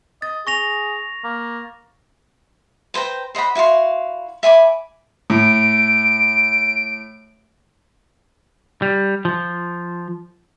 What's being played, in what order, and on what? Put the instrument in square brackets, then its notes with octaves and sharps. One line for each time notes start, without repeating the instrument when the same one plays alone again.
[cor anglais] D#5 [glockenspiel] A6
[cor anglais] G#4 [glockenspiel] C#6 A#6 F7
[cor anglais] A#3
[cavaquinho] B4 C5 G5 A#5
C5 D#5 F#5 B5
E4 F#4 F5 C6
E5 G#5 B5 D6
[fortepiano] A2 [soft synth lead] D7
[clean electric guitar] G3
F3